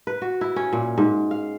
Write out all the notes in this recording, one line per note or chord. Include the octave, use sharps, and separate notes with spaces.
B4
F#4
E4
C#4
A#2
G#2
F5